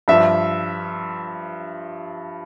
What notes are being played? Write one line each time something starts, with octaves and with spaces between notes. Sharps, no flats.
G2 F3 E5